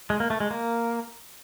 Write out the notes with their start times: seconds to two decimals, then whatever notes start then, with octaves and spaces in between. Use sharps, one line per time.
0.10 G#3
0.20 A#3
0.30 A3
0.40 G#3
0.51 A#3